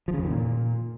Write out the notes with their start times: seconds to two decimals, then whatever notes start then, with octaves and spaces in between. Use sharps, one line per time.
0.08 F3
0.14 C#3
0.19 F2
0.25 D#3
0.31 A#2